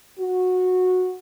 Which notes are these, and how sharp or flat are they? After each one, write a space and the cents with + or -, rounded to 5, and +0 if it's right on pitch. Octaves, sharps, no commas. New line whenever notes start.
F#4 -15